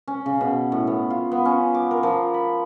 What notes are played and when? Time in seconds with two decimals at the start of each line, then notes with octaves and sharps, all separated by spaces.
0.08 C#4
0.26 C#3
0.41 B2
0.72 A2
0.87 B3
1.10 F4
1.32 B3
1.45 C#4
1.74 D6
1.91 A#4
2.03 F3
2.34 B5